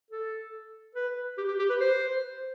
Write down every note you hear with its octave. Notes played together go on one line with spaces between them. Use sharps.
A4
B4
G4
G4
G4
B4
C5